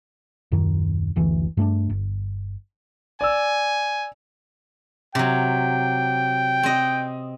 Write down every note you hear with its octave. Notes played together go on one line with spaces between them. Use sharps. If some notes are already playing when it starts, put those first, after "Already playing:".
D#1 F#2 D#3
F#1 D2 E3
G2 A3 C#4 D4
G1
D5 G#5 E6
C3 F#3 G5
C4 D#5